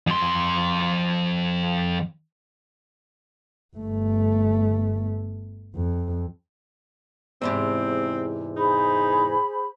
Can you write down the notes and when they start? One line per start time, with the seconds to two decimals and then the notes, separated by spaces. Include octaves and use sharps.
0.07 F2 C6
3.77 G1 A3
5.76 F2
7.42 E2 G#2 C3 C4
8.56 D#4 G#4 C5 B5